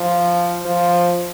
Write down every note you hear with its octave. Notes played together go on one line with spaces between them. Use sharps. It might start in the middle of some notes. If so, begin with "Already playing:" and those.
Already playing: F3
F3